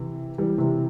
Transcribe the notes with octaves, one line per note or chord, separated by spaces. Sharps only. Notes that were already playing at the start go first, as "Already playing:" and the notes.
Already playing: C3 E3
E3 G3
C3 E3